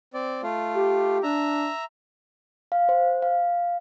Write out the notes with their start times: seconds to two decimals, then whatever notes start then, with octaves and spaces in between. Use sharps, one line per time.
0.14 C4 D5
0.43 A3 F4
0.76 G4
1.23 D4 E5 A#5
2.72 F5
2.89 C5
3.22 F5